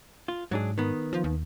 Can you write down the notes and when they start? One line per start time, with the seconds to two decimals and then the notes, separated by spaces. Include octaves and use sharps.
0.28 F4
0.51 G#2 F#3 D4 G#4
0.78 D#3 B3
1.13 F3
1.24 D#2